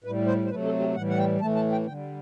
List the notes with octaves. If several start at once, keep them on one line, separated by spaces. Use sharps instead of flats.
A2 G3 B4
C5
C5
C3 F#3 A3 B4
A4
G4
A2 E3 G3 F#5
F#5
G5
A2 E3 A3 A5
A5
G5
D3 G3 G5